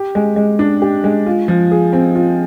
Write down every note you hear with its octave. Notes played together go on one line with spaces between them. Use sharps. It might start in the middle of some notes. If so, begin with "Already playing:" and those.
Already playing: G4
G#3
G#3
D4
G4
G#3
F4
F3
G#4
C4
F4